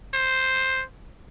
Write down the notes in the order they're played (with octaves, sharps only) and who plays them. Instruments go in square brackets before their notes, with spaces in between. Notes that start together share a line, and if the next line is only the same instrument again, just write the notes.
[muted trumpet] C5